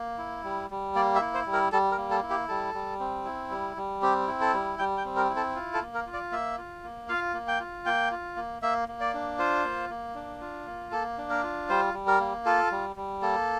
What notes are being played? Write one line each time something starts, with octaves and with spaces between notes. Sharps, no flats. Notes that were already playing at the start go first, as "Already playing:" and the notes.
Already playing: A#3
E4
G3
G3
A#3 D5
E5
E4
C5
G3
A#4
G3 A4
A#4
A#3
A4
E4
G4
G3 A4
G3
C4
E4
G3
G3
C4 G4
E4
A4
G3
G3 G5
G5
C4
A#4
E4
A4
F4
A4
A#3
A#4
F4
D5
A#3 E5
F4
A#3
F4 F5
A#3
G5
F4
A#3 G5
F4
A#3
A#3 E5
A#3
D5
D4
F4 C5
A#3
A#3
D4
F4
A#3
A#3 A4
D4
A#4
F4
G3 C5
G3
A#4
A#3
F4 A4
G3
G3
A#3 A4